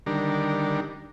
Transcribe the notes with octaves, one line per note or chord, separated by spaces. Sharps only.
D3 D#3 G3 D4 A#4